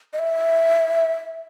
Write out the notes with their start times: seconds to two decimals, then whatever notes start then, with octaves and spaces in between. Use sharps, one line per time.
0.13 D#5
0.19 E5